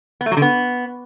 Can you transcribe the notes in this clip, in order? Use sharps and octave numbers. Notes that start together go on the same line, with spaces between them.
B3
A3
F#3
D3
B3